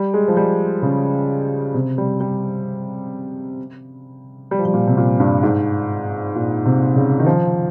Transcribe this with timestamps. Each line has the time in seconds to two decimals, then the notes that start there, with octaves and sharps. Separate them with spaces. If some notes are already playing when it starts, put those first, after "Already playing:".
Already playing: G3
0.14 G#3
0.28 F3
0.37 G3
0.82 C#3
1.74 C3
1.98 G3
2.20 G3
4.51 G3
4.59 F3
4.65 G3
4.74 A#2
4.87 C3
4.97 A#2
5.20 G2
5.43 G#2
6.35 A#2
6.66 C3
6.96 C#3
7.20 D#3
7.26 F3